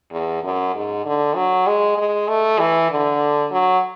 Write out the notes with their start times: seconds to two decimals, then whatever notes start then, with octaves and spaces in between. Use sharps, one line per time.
0.12 E2
0.44 F#2
0.75 G#2
1.05 D3
1.36 F#3
1.67 G#3
1.98 G#3
2.28 A3
2.59 E3
2.91 D3
3.52 F#3